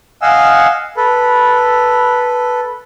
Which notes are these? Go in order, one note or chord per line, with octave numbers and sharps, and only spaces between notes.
D#5 F5 F#5 G#5 E6
A4 B4